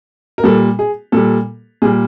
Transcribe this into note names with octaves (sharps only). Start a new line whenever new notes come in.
A#4
A#2 G3 A4
G#4
A#2 G3 A4
A#2 G3 G#4